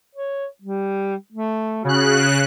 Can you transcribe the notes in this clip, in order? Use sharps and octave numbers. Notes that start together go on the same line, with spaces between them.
C#5
G3
A3
C#3 F#4 F#6